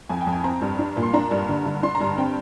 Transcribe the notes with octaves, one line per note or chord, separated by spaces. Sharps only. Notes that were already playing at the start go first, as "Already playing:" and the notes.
F2 G#5
G5
F2
G#5
C4 A#5
G2
D4
A#2
C6
D4 A#5
G2
D3
D3
D4 C6
A#5
G2
C4 G5